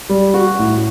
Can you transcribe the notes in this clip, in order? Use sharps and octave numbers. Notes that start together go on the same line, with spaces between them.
G3
F#4
A2